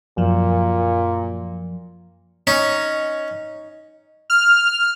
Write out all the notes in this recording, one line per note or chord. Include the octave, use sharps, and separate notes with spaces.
F#2 A#2 F3
C#4 D#4
F6